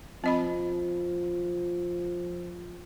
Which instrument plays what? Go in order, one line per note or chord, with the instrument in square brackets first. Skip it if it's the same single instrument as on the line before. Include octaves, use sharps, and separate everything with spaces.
[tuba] F3 [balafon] C4 D#5 B5